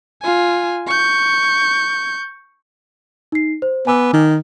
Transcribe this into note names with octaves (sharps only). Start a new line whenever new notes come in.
F4 G#5
C#6 G6
D#4 C7
C5
B3 G#5 D6 E6
D#3